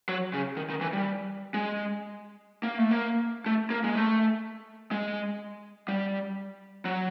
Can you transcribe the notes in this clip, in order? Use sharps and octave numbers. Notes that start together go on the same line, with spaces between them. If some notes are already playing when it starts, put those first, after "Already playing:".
F#3
C#3
D#3
D#3
E3
G3
G#3
A#3
A3
A#3
A3
A#3
G#3
A3
G#3
G3
F#3